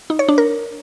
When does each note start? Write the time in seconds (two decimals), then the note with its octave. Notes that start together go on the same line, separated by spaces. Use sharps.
0.10 D#4
0.19 C#5
0.28 D4
0.38 A#4